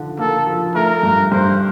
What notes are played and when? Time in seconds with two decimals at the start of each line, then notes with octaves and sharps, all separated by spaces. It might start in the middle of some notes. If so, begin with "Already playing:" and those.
Already playing: D3 F3
0.19 A#3 A4
0.46 F3
0.75 A3 A#4
1.03 G2
1.31 G2 C5